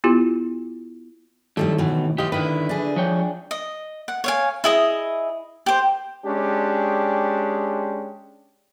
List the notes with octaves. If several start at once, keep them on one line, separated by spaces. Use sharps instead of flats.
B3 E4 F4 G4
A2 D#3 G3 A3 A4
B2 E3
E3 F4 G4 D#5
D3 D#3 E4 B4
D4 G#4
F3 C#5 G5
D#5
F#5
C#5 F5 G#5
E4 G#4 D#5
G4 C5
G#3 C#4 D4 G4